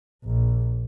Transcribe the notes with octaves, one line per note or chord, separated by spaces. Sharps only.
A#1